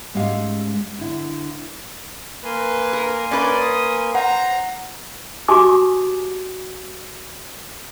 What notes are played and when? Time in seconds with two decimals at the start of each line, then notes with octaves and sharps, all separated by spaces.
0.14 G#2 G#3 A3 C#4 G4 F5
0.98 D3 E4
2.45 A#3 B4 G#5 C6
2.93 A#4
3.31 C#4 B4 D5
3.60 D#6
4.15 C5 F#5 A#5
5.48 F#4 G4 G#5 A5 D6 D#6